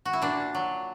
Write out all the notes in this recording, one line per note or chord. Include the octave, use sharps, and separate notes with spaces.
F#4
E4
A#2 D4
F#3